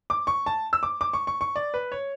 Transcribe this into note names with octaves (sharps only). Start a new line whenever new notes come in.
D6
C#6
A5
E6
D6
D6
C#6
C#6
C#6
D5
B4
C#5